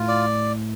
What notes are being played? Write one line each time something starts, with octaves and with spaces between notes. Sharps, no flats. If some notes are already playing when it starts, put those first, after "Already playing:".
Already playing: A2 F4
D5